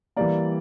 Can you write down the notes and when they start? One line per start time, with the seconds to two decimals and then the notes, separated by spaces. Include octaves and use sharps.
0.16 E3 G3 A#3 D5